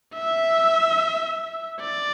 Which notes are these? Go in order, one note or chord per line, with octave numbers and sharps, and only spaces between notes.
E5
D5